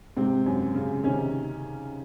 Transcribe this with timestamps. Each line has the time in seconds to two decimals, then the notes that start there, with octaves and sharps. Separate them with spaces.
0.17 G#2 C3 C4
0.46 F#2
0.74 C#3
1.03 C3 D#3 C#4